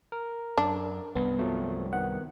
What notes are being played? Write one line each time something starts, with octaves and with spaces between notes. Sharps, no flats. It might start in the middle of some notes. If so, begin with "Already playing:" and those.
A#4
F#2 D4
C2 G2 B3
F3 F#3 A3
D#3 B3 F#5